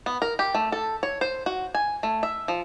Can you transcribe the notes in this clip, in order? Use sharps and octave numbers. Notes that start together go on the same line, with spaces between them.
B3
A#4
G4
A3
A4
C#5
C5
F#4
G#5
A3
E5
F3